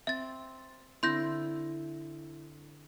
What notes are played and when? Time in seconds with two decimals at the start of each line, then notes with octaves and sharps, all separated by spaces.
0.07 C4 E5 A6
1.03 D3 C4 E4 C6 G6 A#6